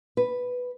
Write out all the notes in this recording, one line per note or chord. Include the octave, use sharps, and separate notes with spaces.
B4